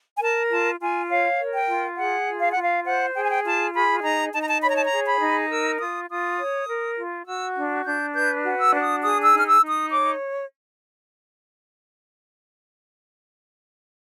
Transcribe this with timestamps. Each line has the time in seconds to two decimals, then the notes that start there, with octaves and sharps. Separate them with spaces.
0.18 G#5
0.22 A#4 A5
0.51 F4 A5
0.80 F4 G#5
1.10 C#5 F5
1.39 A#4
1.54 G5
1.68 F4
1.97 G#4 F#5
2.27 F4
2.41 F5
2.53 F4 F#5
2.63 F5
2.86 C5 F#5
3.15 G#4 G5
3.23 G#5
3.30 G5
3.45 F4 A5
3.74 G#4 B5
4.04 D#4 A#5
4.33 D#4 A5
4.41 A#5
4.48 A5
4.62 C#5 B5
4.69 A#5
4.77 A5
4.85 A#5
4.91 G#4
5.06 B5
5.21 D#4
5.50 A#4 E6
5.79 F4 D#6
6.09 F4 D#6
6.39 C#5
6.68 A#4
6.97 F4
7.26 F#4 E6
7.55 D4
7.85 D4 G6
8.14 B4 G6
8.44 F#4
8.58 E6
8.73 D4
8.80 D#6
9.02 G#4 D#6
9.24 E6
9.32 D#4 F6
9.47 E6
9.61 D#4
9.69 D#6
9.90 C#5 D6